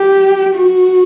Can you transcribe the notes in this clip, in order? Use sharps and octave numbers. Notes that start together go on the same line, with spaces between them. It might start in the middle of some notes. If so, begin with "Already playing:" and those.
Already playing: G4
F#4